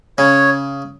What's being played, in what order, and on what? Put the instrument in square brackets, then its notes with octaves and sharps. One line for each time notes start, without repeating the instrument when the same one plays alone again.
[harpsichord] C#3 [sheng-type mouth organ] C#5